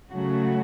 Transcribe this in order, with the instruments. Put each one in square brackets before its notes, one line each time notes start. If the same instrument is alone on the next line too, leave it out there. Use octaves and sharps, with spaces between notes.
[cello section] C#3 F#3 A3 F#4